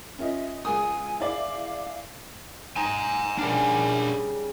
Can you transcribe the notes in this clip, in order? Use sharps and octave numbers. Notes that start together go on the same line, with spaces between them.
C#4 F4 D#5 E5
C#2 G#4 G#5 D#6
E4 G#4 D5 F5
D#4 G#5 A#5
C#3 G3 D4 A#4